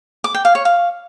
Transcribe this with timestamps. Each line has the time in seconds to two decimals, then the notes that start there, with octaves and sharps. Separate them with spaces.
0.24 D6
0.35 G5
0.45 F5
0.55 C#5
0.65 F5